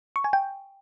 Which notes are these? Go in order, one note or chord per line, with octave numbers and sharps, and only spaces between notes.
C#6
G#5
G5